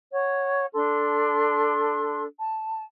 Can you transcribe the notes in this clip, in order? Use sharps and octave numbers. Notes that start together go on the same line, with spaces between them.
C#5 F#5
D4 A4 C6
A5